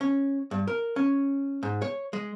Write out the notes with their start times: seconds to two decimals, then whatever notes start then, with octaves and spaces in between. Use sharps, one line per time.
0.01 C#4
0.51 G2
0.67 A#4
0.96 C#4
1.63 G#2
1.82 C#5
2.13 G#3